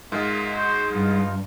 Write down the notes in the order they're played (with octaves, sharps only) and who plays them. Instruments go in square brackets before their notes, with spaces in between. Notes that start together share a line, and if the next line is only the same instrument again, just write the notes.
[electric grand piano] G#2 G#3 [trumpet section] F4 A#4 E5
[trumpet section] F#4 C5
[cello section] G2 [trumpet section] D#4 F4